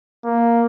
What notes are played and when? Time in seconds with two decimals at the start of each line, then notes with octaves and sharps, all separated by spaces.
0.24 A#3